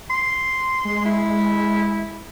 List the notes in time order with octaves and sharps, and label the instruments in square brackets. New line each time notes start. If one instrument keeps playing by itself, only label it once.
[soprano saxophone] C6
[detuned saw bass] G#3
[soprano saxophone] E4